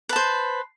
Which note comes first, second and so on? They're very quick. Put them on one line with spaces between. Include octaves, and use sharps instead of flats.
B4 A5 C5